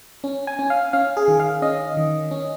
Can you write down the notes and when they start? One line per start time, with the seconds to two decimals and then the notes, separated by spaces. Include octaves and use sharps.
0.24 C#4
0.47 G#5
0.59 C#4
0.70 F5
0.93 C#4 F5
1.17 G#4
1.28 D#3
1.40 F5
1.62 C#4 D#5
1.97 D#3
2.31 C#4